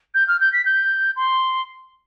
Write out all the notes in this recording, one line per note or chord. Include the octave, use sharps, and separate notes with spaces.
G6
F6
G6
B6
G6
C6